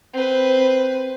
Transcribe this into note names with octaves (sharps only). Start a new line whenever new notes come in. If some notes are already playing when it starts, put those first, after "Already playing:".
C4 B4